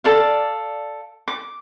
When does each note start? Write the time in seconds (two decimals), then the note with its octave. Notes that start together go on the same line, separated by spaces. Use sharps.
0.04 A4 D5 F5
1.28 D6